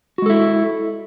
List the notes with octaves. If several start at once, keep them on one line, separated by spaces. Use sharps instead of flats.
G#3 E4 F#4 A4